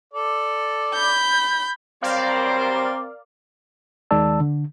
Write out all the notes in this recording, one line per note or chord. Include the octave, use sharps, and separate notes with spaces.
A4 D5
B5 G6
F#3 G3 C4 A#4 C5 D5 F5
D#2 D#3 G#3 D5 A5 E6
D3